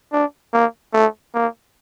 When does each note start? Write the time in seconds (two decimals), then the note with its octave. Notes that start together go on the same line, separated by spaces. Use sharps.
0.13 D4
0.53 A#3
0.94 A3
1.35 A#3